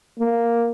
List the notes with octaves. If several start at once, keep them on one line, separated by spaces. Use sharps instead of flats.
A#3